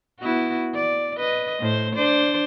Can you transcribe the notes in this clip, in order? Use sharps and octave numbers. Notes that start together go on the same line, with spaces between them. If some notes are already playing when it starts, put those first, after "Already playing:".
B3 E4 F#4
D5
B4 D#5
A2 C5
D4 C5 D5